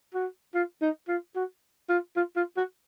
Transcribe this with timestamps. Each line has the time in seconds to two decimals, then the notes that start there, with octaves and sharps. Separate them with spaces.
0.14 F#4
0.54 F4
0.81 D#4
1.08 F4
1.35 F#4
1.89 F4
2.16 F4
2.36 F4
2.56 F#4